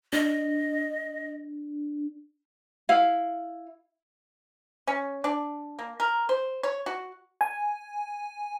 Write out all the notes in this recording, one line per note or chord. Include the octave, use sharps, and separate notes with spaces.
D4 D#5
E4 F5
C#4
D4
A#3
A#4
C5
C#5
F#4
G#5